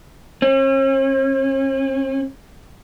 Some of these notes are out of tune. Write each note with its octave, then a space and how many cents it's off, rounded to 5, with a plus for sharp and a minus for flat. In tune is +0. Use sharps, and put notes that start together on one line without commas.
C#4 -45